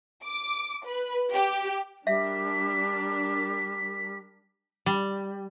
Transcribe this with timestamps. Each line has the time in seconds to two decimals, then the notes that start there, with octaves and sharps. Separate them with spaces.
0.23 D6
0.85 B4
1.32 G4
2.07 G3 D4 A#4 E5 B6
4.86 G3